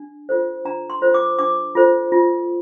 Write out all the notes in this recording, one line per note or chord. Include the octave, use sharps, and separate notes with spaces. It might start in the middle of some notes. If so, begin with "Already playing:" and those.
Already playing: D4
F4 A4 C5
D4 A#5
C6
F4 A4 C5
D6
D4 D6
F4 A4 C5
F4